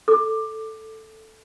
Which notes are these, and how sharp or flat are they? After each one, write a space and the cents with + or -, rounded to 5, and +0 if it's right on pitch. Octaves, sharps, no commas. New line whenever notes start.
A4 +0 D6 +15